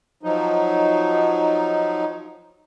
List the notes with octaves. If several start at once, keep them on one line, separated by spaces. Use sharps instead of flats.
F3 F#3 D#4